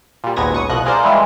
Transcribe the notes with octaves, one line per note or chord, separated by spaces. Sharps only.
A#2 G3
G#1 D#2 A#2 B3 G#6 A#6
C#2 C#6 D#6
C2 B2 F3 D#5 F#6
F4 G#4 A#4 C5 D5
E3 G3 G#3 E4 F4